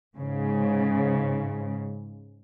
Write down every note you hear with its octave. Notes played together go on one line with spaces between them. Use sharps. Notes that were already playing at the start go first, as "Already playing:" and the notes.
G#2 C#3